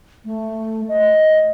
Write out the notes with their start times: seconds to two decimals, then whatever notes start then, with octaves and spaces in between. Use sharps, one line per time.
0.25 A3
0.88 D#5